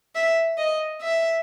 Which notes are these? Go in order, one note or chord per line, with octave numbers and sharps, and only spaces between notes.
E5
D#5
E5